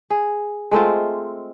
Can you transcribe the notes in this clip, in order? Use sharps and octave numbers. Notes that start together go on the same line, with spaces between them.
G#4
G#3 A3 C4 F4